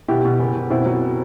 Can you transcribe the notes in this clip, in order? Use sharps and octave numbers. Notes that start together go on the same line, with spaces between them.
B2 E4 G4
B2
F#1
F#1
B2 C4 E4
F#3